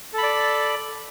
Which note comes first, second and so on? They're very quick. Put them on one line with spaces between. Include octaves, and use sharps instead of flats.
A4 B5 D5